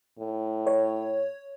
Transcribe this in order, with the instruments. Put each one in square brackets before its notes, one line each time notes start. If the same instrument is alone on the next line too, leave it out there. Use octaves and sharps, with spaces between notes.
[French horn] A2
[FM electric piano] C#5